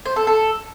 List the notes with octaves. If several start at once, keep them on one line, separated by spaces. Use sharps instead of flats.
C5
A4
A4